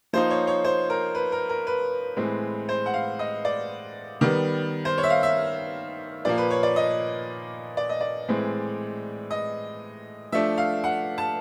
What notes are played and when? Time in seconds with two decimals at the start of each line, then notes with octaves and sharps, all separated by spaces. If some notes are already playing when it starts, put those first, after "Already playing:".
0.13 F3 A#3 D#4 C5
0.30 C#5
0.47 C#5
0.64 C5
0.90 A#4
1.15 B4
1.32 A#4
1.49 A#4
1.67 B4
2.17 A2 E3 G#3 C4
2.69 C5
2.86 F#5
2.94 F5
3.19 D#5
3.45 D5
4.21 D#3 G3 B3
4.85 C5
4.98 C#5
5.03 E5
5.10 F5
5.23 E5
6.25 A#2 F3 A#3 D5
6.38 B4
6.51 C#5
6.63 D5
6.76 D#5
7.77 D5
7.89 D#5
8.01 D5
8.28 A2 E3 G#3 C4
9.31 D#5
10.32 F3 A3 D4 E5
10.58 F5
10.84 F#5
11.18 A5